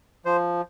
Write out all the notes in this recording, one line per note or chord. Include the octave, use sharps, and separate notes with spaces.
F3 C5